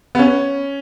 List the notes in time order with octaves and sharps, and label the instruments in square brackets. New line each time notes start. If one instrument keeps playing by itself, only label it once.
[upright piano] B3
C#4